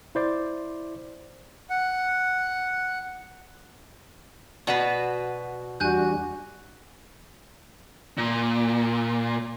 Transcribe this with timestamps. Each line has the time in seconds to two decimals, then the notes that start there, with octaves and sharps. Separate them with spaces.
0.15 E4 C5 D5
1.70 F#5
4.67 B2 F#4 B4 D5 F#5
5.80 E2 G3 D4 F#4 G#5 F#6 G6
8.18 A#2